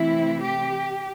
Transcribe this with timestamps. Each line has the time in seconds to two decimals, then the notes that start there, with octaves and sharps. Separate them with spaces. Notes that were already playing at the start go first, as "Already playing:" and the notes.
Already playing: C3 E3 A3 C4 E4
0.39 G4